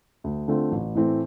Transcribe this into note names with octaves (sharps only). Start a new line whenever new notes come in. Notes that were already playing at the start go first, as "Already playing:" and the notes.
D2
D3 A3 C4 F4
A1
A2 E3 A3 C4